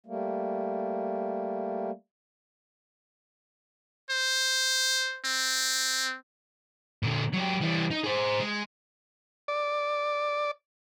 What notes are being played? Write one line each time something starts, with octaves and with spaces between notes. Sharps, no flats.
G3 A3 A#3
C5
C4
A#2 D3
F#3 G4
E3 G3
D#4
G#4 C5
G#3
D5